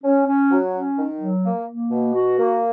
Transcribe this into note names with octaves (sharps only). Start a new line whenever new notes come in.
C#4
C#4
F#3
C#4
D#3
F#3
A#3
A#3
B2
F#4
A#3